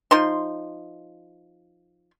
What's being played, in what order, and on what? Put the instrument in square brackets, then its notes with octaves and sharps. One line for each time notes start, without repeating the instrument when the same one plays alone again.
[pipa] F3 D#4 C6